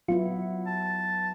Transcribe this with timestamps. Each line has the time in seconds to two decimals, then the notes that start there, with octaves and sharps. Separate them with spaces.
0.08 F#3 B3 E4 F4
0.67 A5